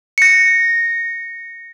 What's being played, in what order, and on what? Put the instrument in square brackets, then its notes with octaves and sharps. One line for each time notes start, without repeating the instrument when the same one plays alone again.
[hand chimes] A#6 C#7